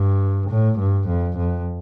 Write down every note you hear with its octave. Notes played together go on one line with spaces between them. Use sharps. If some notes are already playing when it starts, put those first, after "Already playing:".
Already playing: G2
A2
G2
F2
F2